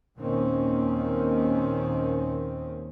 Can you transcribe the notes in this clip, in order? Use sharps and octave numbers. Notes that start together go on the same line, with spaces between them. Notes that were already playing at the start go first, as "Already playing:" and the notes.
D#2 A#2 D#3 A#3 C4 C#4